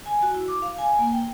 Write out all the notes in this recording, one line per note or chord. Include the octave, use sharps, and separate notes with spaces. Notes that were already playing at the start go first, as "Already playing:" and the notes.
G#5
F#4
E4
D6
F5
G#5
A#3
G5